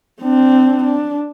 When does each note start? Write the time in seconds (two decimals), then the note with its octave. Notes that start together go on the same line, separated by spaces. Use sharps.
0.22 C4 D4
0.84 D4